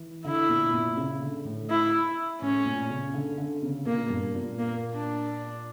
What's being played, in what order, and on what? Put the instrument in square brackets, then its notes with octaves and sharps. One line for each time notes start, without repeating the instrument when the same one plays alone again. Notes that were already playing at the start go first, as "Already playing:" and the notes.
Already playing: [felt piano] E3
[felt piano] D3 [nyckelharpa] E4
[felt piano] A#2
A#2
C#3
D3
A2
[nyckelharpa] E4
[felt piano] A2 [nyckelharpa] C#4
[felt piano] A#2
C#3
D3
D3
C#3
[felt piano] A#2 [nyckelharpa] A#3
[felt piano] G2
A#2
[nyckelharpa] A#3
D4